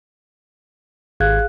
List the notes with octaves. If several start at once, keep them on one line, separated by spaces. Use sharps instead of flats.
G#1 G#4 F5 F#6 G#6